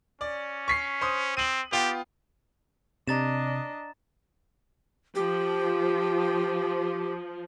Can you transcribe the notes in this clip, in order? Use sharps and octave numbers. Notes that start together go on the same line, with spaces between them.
C#4 D5
C#6 B6 C7
C5 C6 D#6
C4 D#7 F#7
B3 F4 G4 G5
C3 D4 D#5 A#5 A6 E7
F3 G4